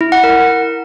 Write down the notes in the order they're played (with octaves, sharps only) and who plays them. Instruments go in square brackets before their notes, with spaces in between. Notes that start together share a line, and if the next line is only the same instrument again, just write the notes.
[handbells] E4
F#5
A#4